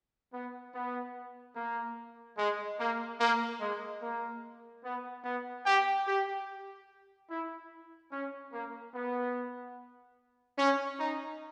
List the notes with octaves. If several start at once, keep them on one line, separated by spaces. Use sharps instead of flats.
B3
B3
A#3
G#3
A#3
A#3
G#3
A#3
B3
B3
G4
G4
E4
C#4
A#3
B3
C#4
D#4